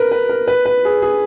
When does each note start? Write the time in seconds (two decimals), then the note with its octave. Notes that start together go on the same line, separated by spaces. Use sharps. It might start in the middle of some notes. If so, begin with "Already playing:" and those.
Already playing: A#4 B4
0.11 B4
0.29 A#4
0.48 B4
0.66 B4
0.85 G#4
1.02 G#4